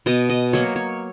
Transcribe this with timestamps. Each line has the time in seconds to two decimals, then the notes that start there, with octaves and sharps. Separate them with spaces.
0.06 B2 D#5
0.29 D#5
0.53 F#3 A#3 C#5
0.76 C#5